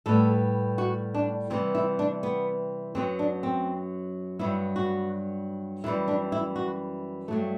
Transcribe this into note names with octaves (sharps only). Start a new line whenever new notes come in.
A2 G3 B3 A4
F#4
D4
C3 E3 G3 B3 C4
E4
D4
B3
F#2 F#3 B3 C4
D4
C4
G2 F#3 B3 E4
F#4
F#2 E3 G3 E4
D4
E4
F#4
G2 F#3 A3